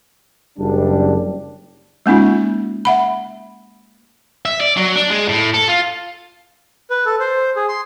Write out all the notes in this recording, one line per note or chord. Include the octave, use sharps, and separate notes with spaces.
F#1 G3 D4
G#3 A#3 C#4 D#4 F4
E5 F#5 B5
E5
D5
F#3
D4
G#3
A2
A4
F4
B4
A4
C5
G#4
C6